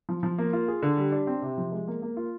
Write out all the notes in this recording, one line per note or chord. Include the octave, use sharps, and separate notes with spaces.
F3
F3
A#3
F4
G#4
D3
G3
D4
C4
C3
F3
G#3
A#3
A#3
F4